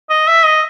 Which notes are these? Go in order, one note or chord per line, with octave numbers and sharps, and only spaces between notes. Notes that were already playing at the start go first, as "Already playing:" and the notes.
D#5
E5
D#5